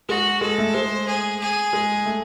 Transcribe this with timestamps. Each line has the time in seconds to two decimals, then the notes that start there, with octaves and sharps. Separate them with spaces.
0.09 G#3 F#4
0.41 G#3 A4
0.58 A3
0.74 G#3 C5
1.07 G#4
1.40 G#4
1.73 G#3
2.05 A3